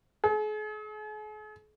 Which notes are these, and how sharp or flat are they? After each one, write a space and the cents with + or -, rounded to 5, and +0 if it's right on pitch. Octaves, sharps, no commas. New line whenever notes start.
G#4 +45